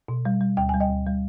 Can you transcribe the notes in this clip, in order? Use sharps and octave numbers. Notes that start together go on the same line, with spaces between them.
B2
G3
G3
D2 G5
G3 G#5
D#5 G5
D2
G3